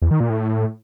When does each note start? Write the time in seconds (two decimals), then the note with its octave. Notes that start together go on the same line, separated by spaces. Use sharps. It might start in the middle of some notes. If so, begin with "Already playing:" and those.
0.02 E2
0.11 D#3
0.20 A#2
0.30 A2